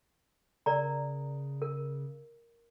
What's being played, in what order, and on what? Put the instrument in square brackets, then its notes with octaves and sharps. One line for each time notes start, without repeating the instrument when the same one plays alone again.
[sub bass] C#3 [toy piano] A#4 D5 A#5
[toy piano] A#4